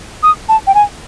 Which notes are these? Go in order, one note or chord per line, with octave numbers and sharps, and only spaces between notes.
D#6
A5
G5
G#5